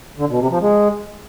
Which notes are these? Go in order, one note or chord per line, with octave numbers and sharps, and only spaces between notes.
D3
B2
C3
F3
G#3